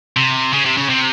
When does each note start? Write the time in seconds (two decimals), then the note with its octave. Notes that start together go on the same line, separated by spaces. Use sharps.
0.16 C3
0.53 C#3
0.65 C3
0.77 C#3
0.90 C3